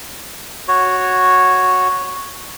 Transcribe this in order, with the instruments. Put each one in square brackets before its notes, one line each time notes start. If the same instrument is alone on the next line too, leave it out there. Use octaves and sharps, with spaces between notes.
[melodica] F#4 C#5